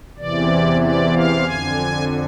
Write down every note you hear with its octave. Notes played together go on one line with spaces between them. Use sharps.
E2 C3 E3 D5
D5
F5
F2 D3 G#5